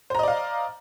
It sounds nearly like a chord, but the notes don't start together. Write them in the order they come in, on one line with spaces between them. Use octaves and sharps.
C5 A#5 D#5 D5 F5